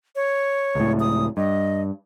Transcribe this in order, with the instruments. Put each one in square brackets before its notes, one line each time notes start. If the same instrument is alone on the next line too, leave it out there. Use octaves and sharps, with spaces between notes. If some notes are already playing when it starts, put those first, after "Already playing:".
[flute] C#5
[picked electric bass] C#2 A2
[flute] D#6
[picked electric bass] G2 [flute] D#5